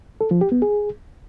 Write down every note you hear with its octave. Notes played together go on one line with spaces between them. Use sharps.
A4
F3
G4
B3
G#4